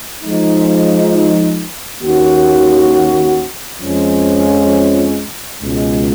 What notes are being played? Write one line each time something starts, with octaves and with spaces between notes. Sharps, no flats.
F3 G#3 D#4
D#2 D#3 A#3 C#4 F#4
F2 F3 G#3 C#4
C#2 B2 G#3